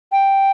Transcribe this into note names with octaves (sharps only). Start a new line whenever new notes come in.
G5